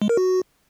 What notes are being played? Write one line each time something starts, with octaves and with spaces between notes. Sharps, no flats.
G#3
A#4
F#4